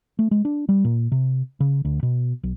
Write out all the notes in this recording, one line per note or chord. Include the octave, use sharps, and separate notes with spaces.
A3
G#3
D4
G3
A#2
C3
C#3
D2
B2
B1